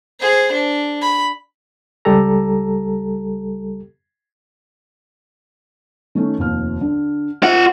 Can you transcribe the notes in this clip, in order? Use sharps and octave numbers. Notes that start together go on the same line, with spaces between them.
G#4 C5
D4
B5
C#2 G3 G4 A4 A#5
D#3 A3 C#4
F1 D#2 F6
D3
F4 C5 E5 F#5